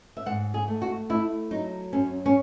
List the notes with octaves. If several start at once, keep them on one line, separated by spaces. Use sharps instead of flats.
E5
G#2 F#5
G#4
A3
F#4
A3 E4
F#3 D#4
F#2 C#4
C#4